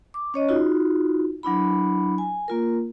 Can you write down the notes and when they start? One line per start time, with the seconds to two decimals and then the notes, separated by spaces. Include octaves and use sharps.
0.14 D6
0.34 C#4 C#5 D#5
0.48 D#4 F4 F#4
1.43 F#3 D4 E4 B5
2.18 G#5
2.48 A#3 F4 A#4